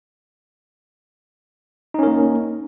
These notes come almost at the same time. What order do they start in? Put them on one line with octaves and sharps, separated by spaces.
D#4 C#4 A#4 A#3